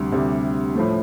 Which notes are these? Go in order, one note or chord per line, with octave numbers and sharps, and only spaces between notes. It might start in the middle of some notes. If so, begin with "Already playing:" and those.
Already playing: D2 C3 G3
D2 C3 G3
A2 F3 A3